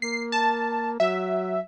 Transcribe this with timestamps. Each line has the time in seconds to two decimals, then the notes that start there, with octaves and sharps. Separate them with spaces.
0.02 A#3 C7
0.32 A5
1.00 F#3 E5